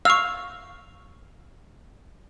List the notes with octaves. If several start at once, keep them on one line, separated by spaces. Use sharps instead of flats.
F5 C#6 E6